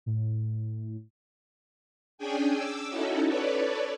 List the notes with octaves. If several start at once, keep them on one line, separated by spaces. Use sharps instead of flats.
A2
C#4 D4 G#4 G5 G#5
D6 E6
C#4 D#4 E4 F#4 A4
A4 B4 C#5 D5